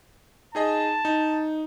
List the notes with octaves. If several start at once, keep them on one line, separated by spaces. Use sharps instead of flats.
D#4 G#4 D#5 A5
D#4